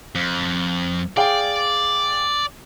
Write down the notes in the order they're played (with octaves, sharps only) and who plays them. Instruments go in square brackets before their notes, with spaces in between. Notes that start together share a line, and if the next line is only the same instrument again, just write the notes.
[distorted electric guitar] F2
[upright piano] G#4 F5 G5 [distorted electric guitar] D5